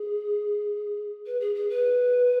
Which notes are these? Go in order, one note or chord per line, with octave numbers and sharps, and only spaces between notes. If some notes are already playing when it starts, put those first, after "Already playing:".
Already playing: G#4
B4
G#4
G#4
B4